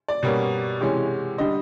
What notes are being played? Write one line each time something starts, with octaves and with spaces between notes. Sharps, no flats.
D5
B2 G3 A#3 C#4
C3 E3 G#3 C#4
D3 G3 D#5